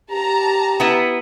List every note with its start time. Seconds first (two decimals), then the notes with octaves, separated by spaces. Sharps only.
0.11 G4 A5 A#5
0.80 B3 E4 B4